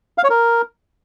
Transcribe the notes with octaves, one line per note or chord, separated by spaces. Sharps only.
F5
C#5
A#4